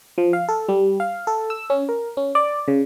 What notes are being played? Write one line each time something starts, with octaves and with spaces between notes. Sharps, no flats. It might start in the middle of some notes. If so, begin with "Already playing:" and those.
F3
F5
A4
G3
F5
A4
E6
C#4
A#4
C#4
D5
C#3